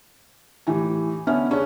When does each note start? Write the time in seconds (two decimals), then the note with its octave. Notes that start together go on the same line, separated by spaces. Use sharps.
0.67 A2 E3 G4 G#5
1.27 D3 B3 C#4 E5 G#5 F6
1.51 C#3 C#4 D4